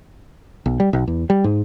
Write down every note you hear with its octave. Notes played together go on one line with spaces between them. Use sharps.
B1
G3
B1
E2
G3
G#2